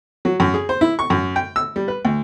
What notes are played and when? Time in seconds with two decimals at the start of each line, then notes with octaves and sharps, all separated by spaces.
0.25 F#3
0.40 F#2
0.54 G#4
0.69 C5
0.81 E4
0.99 C#6
1.10 F#2
1.36 G5
1.56 E6
1.76 G3
1.88 B4
2.05 D2